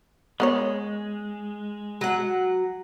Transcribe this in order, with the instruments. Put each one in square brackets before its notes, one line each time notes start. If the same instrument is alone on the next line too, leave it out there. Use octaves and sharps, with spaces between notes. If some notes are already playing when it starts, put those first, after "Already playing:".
[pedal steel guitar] G#3 [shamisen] B3 A#4 C#5
[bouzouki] F#3 F#5